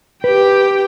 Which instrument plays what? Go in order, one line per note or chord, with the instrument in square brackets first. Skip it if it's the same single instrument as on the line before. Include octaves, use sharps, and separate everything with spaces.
[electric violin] G4 G5 [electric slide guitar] B4